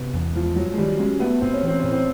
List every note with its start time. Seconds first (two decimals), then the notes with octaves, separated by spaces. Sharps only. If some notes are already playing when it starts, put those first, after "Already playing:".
Already playing: C3 B3
0.13 E2
0.35 F3 G#3
0.56 G2 F#3
0.74 G#3
0.78 D#3 G3
0.99 G#3 C#4
1.20 A3 B3
1.41 A2 C4
1.53 C#4
1.63 E3 C4
1.79 A2 C#4
1.92 C4